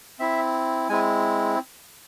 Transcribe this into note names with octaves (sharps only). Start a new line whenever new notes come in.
C4 E4 E5
G#3 C4 E4 G#5